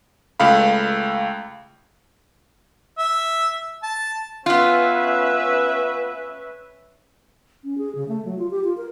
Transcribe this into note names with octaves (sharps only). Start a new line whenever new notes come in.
C#2 A3 F5 B5
E5
A5
B3 C#4 F4 B4 E5
C#4
G#4
C#3
A3
F#3
F4
G4
F4
A#4